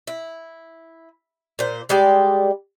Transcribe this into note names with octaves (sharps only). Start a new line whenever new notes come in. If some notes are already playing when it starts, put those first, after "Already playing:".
E4
A#2 C5
G3 G#3 D5 G5